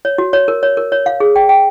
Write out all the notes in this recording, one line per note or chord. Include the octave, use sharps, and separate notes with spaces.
C#5
F#4
C#5
A#4
C#5
A#4
C#5
F5
G#4
G5
G5